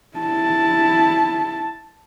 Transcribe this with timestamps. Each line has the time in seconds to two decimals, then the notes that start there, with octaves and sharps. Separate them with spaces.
0.17 E4 A5